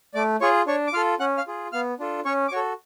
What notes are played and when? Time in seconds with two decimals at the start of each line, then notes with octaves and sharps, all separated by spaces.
0.14 A3 D5 D6
0.41 F4 G#4 C#5 C#6
0.67 D4 C#5 C#6
0.87 D6
0.93 F4 F5 F6
0.97 A4
1.20 C#4 F#5 F#6
1.37 F5 F6
1.47 F4 G#4
1.72 B3 F5 F6
1.99 D4 F4 A4
2.25 C#4 C#5 C#6
2.48 D6
2.52 F#4 A4 C#5 C#6